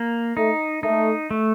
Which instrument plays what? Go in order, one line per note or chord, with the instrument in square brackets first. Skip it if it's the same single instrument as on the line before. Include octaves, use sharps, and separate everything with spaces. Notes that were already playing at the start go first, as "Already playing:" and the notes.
Already playing: [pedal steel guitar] A#3
[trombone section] A3 [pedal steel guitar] D#4
[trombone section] A3 [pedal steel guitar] D#4
[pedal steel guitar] A3